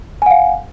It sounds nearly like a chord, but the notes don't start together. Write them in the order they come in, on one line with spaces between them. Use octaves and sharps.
G#5 F#5 F5